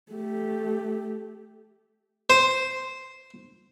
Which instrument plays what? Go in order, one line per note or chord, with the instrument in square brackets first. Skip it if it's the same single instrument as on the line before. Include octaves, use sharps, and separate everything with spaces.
[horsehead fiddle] A3 G4
[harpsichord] C5